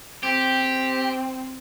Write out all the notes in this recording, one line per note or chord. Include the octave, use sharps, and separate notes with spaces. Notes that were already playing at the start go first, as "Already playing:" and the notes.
C4 G4